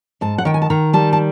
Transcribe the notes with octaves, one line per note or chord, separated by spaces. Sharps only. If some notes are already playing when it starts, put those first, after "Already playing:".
G#2 A5
F#5
D#3 G5
G#5
A5
D#3 A#5
G3 A5
A5